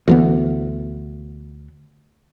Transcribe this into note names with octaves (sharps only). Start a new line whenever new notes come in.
D2 E3 B3